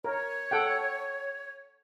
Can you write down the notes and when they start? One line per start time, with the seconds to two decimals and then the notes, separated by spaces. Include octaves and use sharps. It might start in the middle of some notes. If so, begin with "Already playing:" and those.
0.04 A#4 C#5
0.51 A4 F#5 G5